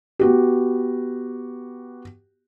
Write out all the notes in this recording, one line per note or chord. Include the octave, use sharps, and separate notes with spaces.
B3 F#4 G4